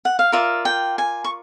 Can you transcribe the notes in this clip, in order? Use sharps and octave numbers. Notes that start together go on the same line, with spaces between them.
F#5
F5
F4 A#4 D5 E5
G5
G#5
C#6